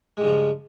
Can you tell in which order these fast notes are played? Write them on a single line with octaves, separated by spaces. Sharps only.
G#3 G2 C#3 F3